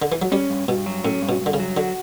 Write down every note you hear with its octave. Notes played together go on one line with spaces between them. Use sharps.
D3
E3
F#3
G3 C#4
G2
G2 B2
F#3
A2 C#4
G2
B2
G2 D3
C#3
F#3
D3 F#4